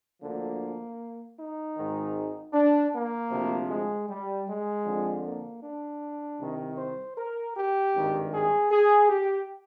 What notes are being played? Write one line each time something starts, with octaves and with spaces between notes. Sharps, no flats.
D2 D3 F3 A#3
D#4
G#1 G#2 D#3
D4
A#3
D2 C3 F3
G#3
G3
G#3
F2 D3 F3
A#3
D4
C2 C3 D#3
C5
A#4
G4
G#1 G2 D#3
G#4
G#4
G4